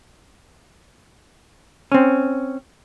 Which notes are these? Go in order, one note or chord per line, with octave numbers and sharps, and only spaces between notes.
C4 C#4